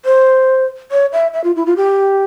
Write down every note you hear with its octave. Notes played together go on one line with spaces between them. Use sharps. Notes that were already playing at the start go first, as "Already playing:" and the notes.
C5
C#5
E5
E5
F4
E4
F4
G4